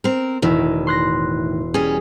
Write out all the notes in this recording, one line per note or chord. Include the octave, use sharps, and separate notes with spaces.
C4 A#4
E1 A2 D#3 E4
C6 F#6 A#6
G3 C#4 G#4